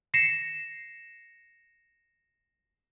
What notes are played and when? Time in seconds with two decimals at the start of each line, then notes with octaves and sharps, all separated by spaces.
0.14 A#6 C7 C#7 E7